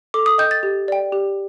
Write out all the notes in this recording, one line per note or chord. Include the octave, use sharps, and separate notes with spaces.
A4 D6
D#6
D#5 G5 G6
A6
G4
D5 G5
G4